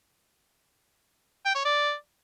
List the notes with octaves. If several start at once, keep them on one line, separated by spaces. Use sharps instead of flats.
G5
C#5
D5